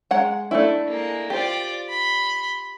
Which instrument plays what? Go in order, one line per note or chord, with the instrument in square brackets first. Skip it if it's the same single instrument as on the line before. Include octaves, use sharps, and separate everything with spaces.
[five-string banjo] G#3 F#5 A#5
A3 D4 E4
[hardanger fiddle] G#3 A#3
[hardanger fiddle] F4 D5 [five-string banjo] G4 C5
[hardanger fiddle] B5 C6